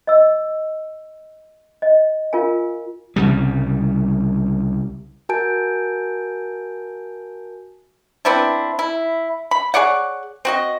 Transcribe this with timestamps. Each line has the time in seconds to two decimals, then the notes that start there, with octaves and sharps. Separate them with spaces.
0.07 D#5 E6
1.82 D#5
2.33 F4 A#4 F5 G#5
3.16 C2 C#3 G3
5.29 F#4 A#4 G#5 A5 G6 D7
8.25 B3 C4 D4 E4
8.79 E4
9.51 B5
9.74 G#4 C#5 D5 F#5
10.45 C4 F#4 D#5